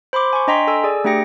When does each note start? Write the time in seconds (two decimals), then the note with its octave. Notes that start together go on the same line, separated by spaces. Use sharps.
0.13 C5 B5 C6 D6
0.33 G#5 C#6
0.48 D4 D#5 G5 A#5 C6 B6
0.67 A4 G#5 E6
0.84 G#4 D5
1.04 A3 D4 G4 G5 A#6 C#7